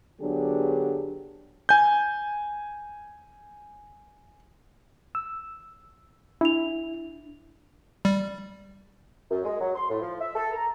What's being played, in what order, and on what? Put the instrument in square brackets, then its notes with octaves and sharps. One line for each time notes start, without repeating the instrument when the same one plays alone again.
[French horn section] D3 F#3 B3 D4 G4 G#4
[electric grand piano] G#5 G6
[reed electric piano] E6
[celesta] D4 F7 [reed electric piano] E4
[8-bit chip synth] G3
[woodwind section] F#2
G#3
F#3
C6
A2
F3
E5
A4
A#5